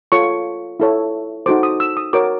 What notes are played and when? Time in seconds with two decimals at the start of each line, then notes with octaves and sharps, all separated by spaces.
0.12 F4 A4 C#5 C#6
0.80 E4 A4 C#5
1.46 D#4 F#4 A4 C5 D6
1.63 D#6
1.80 E6
1.97 D#6
2.13 F#4 A#4 C#5 D6